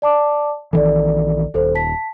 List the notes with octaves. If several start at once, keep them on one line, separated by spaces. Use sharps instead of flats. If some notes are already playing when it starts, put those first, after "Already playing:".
D5 A5 D6
A#1 D#3 E3 A4 D5
D#1 A4 C5
A5 B6